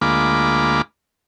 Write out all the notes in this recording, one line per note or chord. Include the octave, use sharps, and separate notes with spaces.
D2 G#3 A#3 F4 B5 D6